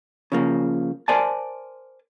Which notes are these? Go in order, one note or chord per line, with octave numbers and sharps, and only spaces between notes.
C#3 F3 A#3
A#4 C5 D5 G#5 A5